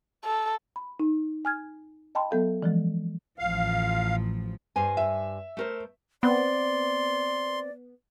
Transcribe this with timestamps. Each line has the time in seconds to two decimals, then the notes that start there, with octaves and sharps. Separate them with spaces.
0.24 A4
0.76 B5
1.00 D#4
1.45 G#5 F6 G#6
2.15 D#5 G5 A5 B5 C6
2.31 F#3 B3 A4 F5
2.62 E3 F3 G#3
3.39 A1 F3 F5
4.76 G2 C5 G#5
4.97 E5
5.57 A3 A#4 C5
6.23 B3 C4 D5 C6